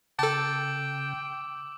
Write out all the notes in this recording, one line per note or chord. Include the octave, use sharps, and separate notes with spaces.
C#3 A4 G5 A5 D6 E6